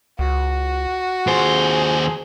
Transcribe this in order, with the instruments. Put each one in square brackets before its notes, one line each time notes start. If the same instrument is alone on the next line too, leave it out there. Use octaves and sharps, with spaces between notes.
[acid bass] C#2 [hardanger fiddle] F#4
[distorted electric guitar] D#2 C5 [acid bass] F4 [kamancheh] G#4